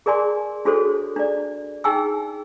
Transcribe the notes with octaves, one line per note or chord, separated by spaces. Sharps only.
G#4 A#4 D5 G#5 C6
D4 F#4 G#4 A4 C5 C#5
D4 D5
D#4 G#4 G5 G#5 E6